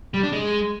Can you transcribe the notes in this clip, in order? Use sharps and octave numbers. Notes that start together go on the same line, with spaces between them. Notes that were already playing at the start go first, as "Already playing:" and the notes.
G3
D4
G#3